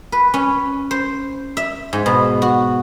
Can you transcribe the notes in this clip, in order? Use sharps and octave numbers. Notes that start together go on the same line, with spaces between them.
B4
C#4
C5
E5
G#2
B2
F#4